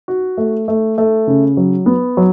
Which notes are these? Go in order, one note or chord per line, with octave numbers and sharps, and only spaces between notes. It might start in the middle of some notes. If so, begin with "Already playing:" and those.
F#4
A3
A3
A3
C#3
F#3
B3
F#3